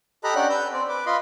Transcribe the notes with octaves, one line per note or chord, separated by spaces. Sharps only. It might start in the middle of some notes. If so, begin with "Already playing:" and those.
G4 A4 D#5 A#5 B5 F#6
C#4 D4 D5 F#5 G5 F#6
B4 E6 G6
C4 D5
B4 D6
F4 B4 D#5 B5 C6